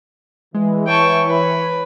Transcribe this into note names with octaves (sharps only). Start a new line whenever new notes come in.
E3 G#3
C#5 G5 A5 C#6
B4